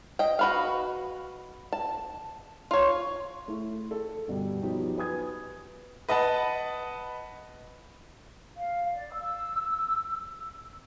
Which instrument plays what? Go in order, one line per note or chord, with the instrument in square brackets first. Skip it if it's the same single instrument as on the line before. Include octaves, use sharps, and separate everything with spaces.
[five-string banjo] D#5 G5
F#4 B4 F5
A5
F4 C#5
[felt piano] A3 E4
A4
G2 B2 D3 G3
F3 F#3 B3 D#4 G4
B4 G#5 D#6 G#6
[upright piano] B4 D#5 F#5 A5 B5
[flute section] F5
D5
E6